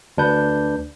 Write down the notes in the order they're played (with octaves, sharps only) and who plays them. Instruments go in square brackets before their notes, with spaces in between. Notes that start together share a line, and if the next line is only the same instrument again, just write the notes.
[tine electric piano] D2 D4 B4 G6